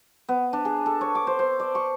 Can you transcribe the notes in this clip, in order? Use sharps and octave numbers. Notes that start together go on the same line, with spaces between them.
B3
D4
G#4
A4
C#5
D6
C5
C5
D5
C#6